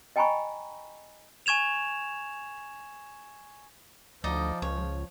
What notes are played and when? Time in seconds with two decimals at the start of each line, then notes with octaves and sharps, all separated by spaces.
0.16 D#5 G5 G#5 A#5 B5 C#6
1.46 G#5 C#6 G#6 E7 F7
4.24 D2 F3 D#4 D5 D#5
4.62 C#2 C#5